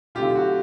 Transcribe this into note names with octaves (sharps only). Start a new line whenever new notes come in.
D3 F#3 A3 C4 D#4 F4 G4
F#4